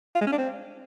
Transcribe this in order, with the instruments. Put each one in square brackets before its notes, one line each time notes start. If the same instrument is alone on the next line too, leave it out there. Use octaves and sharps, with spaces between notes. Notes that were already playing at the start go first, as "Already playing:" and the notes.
[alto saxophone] F4
G#3
C#4
D4
C4